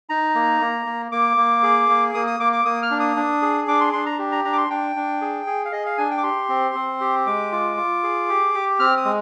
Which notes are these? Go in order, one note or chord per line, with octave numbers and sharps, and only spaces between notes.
D#4 A#5
A#3
A#3
A#3
A#3 D6
A#3
G#4
A#3
A#3 D#6
D#6
A#3 D6
D6
A#3 D#6
F6
D4
D#6
D4
G#4
D4 D6
C6
D4 C6
A#5
G4
A#5
D4 A#5
D6
C6
D4 G5
D4
G#4
G#4
F5
G#4 D#5
F5
D4 G#5
G5
D6
G4 C6
C4
C4
G4
G#3 D6
F4
F4
G#4
G4
G4
C4 F6
D#6
G#3